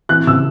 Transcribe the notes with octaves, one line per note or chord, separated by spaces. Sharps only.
E3 F#6
C#3 E6